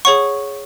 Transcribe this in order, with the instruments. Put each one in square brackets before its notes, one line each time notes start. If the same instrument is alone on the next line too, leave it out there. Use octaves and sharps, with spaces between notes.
[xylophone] G#4 C#5 F#5 C#6